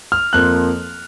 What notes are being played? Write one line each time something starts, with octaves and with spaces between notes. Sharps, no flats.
F6
F2 F3 A#3 F#6